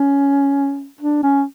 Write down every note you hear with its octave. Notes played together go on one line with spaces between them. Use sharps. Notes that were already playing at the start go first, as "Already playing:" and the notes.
Already playing: C#4
D4
C#4